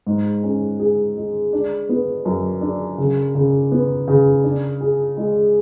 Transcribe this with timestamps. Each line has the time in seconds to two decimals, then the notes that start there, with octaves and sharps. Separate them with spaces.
0.06 G#2
0.43 C#4
0.80 G#4
1.17 G#3
1.53 D4
1.89 B3
2.25 F#2
2.61 D4
2.98 C#3
3.35 C#3
3.72 B3
4.08 C#3
4.44 D4
4.81 G#4
5.17 G#3